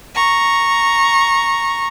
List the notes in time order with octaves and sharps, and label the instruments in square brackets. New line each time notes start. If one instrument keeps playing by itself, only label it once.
[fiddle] A#5 C#6